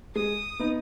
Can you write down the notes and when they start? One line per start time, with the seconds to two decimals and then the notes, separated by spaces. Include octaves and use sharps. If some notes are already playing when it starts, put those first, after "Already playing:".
0.15 G#3 D#6
0.59 B3 D#4